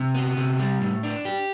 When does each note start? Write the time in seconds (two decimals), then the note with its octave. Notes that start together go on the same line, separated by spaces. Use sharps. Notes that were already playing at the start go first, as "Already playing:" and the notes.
Already playing: C3
0.15 B3
0.37 C3
0.59 G3
0.81 A2
1.03 D4
1.25 G4